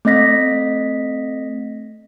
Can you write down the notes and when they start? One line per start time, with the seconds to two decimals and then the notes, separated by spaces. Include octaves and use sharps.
0.05 A3 C4 D#5 A#6 B6